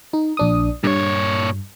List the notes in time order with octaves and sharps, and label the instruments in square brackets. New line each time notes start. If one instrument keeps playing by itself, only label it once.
[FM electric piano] D#4
A#1 D4 D#6
[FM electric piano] G2 [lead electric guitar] A#2 C#5